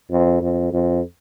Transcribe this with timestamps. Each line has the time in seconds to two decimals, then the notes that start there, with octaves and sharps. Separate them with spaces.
0.11 F2
0.42 F2
0.73 F2